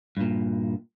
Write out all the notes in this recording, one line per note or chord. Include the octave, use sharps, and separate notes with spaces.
G2 A#2